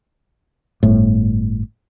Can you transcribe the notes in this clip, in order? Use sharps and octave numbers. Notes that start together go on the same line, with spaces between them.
G1 A2